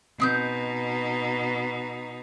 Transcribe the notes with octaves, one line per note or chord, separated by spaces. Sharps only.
B2 C4 D#4 D#6 G6